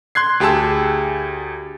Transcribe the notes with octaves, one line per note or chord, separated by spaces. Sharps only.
C6 F#6 G#6 C7
D2 G4 G#4 A5 E6